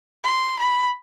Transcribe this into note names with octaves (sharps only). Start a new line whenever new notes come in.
C6
B5